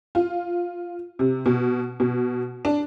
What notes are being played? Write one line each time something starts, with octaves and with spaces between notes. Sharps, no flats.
F4
C3
B2
B2
D4